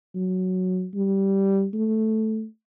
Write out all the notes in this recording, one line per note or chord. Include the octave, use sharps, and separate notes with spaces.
F#3
G3
A3